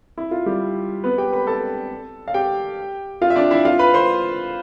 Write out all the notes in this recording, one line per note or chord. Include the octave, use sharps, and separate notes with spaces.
E4
F4
G3 G4
B3 B4
G4 G5
B4 B5
A4 A5
F5
G4 G5
F4 F5
E5
D4 D5
E4 E5
F4 F5
B4 B5
C5 C6